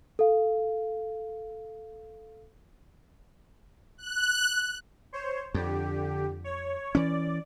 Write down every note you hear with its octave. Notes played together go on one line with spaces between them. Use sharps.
A4 F5
F#6
C5 C#5
F2 D3 G4
C#5
E3 C#4 D5